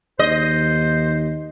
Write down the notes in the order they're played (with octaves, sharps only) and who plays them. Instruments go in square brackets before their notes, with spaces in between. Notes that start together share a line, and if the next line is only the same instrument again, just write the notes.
[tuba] D#2 [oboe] C5 [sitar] D#5